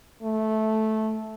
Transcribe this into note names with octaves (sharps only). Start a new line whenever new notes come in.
A3